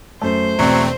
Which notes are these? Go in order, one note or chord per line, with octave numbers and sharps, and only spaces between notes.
F#2 A3 C5
E1 E2 F#3 A3 C4 D5